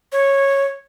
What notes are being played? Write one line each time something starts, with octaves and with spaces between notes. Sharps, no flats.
C#5